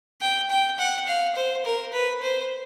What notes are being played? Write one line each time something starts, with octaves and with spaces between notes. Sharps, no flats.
G5
G5
F#5
F5
C5
A#4
B4
C5